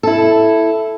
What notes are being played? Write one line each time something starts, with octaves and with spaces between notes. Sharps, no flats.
E4 A4